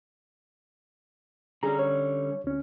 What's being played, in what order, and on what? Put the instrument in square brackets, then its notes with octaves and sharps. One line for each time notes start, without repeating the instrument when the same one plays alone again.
[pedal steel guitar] D3 G3 C#4 [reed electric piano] G#4 A#5
[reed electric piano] C#5
D2 C#4